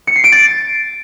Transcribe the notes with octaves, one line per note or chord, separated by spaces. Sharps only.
C#7
C7
D7
A6